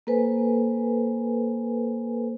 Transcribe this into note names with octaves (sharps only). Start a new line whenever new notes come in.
A#3 A4 B4 C5 G#5